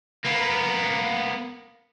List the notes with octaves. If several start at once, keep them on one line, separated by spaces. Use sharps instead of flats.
A#3 B3